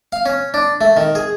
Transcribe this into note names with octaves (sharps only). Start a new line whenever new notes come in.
F5
C#4
D4
A3
D#3
G#4